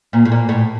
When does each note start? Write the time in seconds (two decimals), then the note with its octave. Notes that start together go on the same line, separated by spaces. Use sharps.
0.13 A#2
0.25 A2
0.32 A#2
0.49 A2